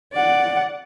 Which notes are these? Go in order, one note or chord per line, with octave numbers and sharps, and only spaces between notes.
D5 F#5